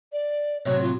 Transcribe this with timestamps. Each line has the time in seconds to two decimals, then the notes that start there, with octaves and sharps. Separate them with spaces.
0.12 D5
0.65 A2 C3 F#3 C#5
0.82 F4